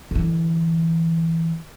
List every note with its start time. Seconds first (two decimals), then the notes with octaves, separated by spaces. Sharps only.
0.11 D3 E3